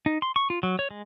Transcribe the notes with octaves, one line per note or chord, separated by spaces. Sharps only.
D#4
C6
C#6
F4
F#3
C#5
G#3